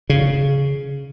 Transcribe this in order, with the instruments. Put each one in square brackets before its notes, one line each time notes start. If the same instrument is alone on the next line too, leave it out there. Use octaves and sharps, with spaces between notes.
[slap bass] C#3